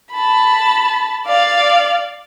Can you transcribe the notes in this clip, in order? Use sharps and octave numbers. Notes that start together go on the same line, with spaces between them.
A5 B5
D5 F5